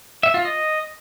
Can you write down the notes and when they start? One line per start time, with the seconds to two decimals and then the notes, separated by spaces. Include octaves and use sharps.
0.23 E5
0.34 F4
0.45 D#5